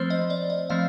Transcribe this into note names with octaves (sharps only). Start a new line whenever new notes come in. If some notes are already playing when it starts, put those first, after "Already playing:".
Already playing: F3 A3 C4 C5
D#5
D5
D#5
F3 A3 C4 F5